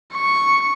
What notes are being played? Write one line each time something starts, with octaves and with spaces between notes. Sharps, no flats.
C#6